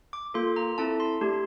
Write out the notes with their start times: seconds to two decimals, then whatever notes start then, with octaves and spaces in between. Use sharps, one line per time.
0.13 D6
0.34 A#3 F4 A4 C6
0.56 A#5
0.78 C4 E4 A4 A5
1.00 C6
1.21 A3 D4 G4